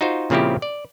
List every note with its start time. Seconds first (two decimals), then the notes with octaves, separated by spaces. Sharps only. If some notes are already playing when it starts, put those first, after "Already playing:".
0.01 D#4 F4 F#4 C5
0.30 A#2 C#3 F3 C4 E4 G4
0.62 D5